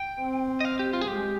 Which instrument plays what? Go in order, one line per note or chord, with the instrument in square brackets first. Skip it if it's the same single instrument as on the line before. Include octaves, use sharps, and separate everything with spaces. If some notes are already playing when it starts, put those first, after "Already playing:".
Already playing: [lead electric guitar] G5
[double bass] C4
[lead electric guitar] D#5
F5
G4
F4
G#4
[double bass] G#3 [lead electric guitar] G4